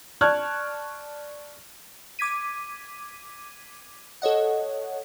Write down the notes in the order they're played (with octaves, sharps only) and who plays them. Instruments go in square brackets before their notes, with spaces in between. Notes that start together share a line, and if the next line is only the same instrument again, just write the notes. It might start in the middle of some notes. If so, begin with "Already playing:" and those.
[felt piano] D5 A5 C#6 F6 F#6 G#6
[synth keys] D6 G#6 B6 D#7
A4 C#5 D#5 F#5